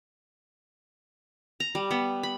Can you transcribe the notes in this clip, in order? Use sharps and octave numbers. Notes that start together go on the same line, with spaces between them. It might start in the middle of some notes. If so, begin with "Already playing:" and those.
A#5
G3
B3
B5